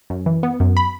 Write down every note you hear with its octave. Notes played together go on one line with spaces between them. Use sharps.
F#2
E3
B3
F#2
B5